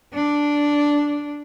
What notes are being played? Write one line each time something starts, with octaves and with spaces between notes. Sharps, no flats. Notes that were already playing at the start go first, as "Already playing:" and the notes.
D4